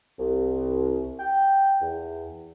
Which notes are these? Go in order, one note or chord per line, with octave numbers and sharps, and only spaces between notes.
C2
G5
E2